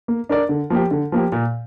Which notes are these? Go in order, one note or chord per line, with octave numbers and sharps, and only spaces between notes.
A#3
D4 A#4 D5
D3
F3 A#3 G4
D3
F3 A#3 G4
A#2